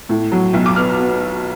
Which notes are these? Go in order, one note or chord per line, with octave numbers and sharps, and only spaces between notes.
A2
F#3
B1
D6
B3 F6
B3